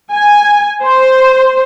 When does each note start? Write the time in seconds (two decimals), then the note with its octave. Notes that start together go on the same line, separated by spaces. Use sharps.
0.12 G#5
0.85 C5